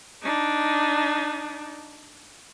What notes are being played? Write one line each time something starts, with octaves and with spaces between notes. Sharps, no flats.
D4 D#4